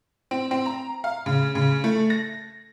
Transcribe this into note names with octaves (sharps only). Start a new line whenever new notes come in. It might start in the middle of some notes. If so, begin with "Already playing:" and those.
C4
C4
A#5
F5
C#3
C#3
A3
A#6